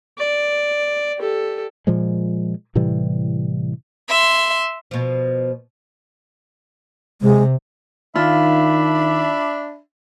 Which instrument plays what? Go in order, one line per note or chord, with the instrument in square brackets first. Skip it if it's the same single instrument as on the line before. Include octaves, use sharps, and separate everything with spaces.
[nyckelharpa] D5
G4 A4
[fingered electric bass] A#2 F3 G#3
A2 C3 E3 G3
[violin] E5 C6
[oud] B2 F3
[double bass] C3 [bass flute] G#3
[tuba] D#3 [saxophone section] D4 E5 [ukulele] F4 [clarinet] B5